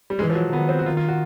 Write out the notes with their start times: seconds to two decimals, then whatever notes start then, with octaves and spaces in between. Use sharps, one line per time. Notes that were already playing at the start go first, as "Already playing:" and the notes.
0.10 G3
0.19 E3 G#3
0.30 F3
0.35 F#3
0.52 D#3 B3
0.69 C4
0.79 F#4
0.86 D#3 F4
0.97 F4
1.08 F#4